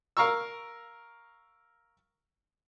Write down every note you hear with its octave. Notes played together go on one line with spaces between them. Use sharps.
A#4 F5 A#5 C#6 E6